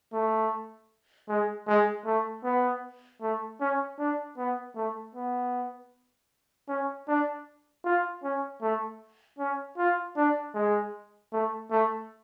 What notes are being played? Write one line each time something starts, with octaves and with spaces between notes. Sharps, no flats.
A3
G#3
G#3
A3
B3
A3
C#4
D4
B3
A3
B3
C#4
D4
F4
C#4
A3
C#4
F4
D4
G#3
A3
A3